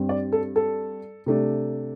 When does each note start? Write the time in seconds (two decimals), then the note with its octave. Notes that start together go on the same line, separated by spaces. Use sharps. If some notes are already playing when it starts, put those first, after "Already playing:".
Already playing: G2 G3 C4
0.09 D5
0.32 A4
0.56 A4
1.26 C3 A3 D4